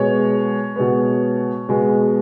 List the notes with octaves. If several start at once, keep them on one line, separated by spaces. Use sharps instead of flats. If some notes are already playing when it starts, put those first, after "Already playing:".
Already playing: B2 G#3 B3 C#5
B2 G#3 B3
B2 G#3 B3